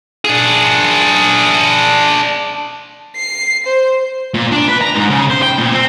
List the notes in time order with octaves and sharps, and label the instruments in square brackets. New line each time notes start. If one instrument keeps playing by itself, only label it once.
[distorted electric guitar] D4 G#4
[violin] C7
C5
[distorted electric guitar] A#2
D4
B4
A#5
G#2
C#3
C5
G5
A#2
C4